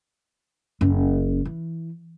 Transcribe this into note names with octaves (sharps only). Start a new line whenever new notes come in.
F#1 C#4
E3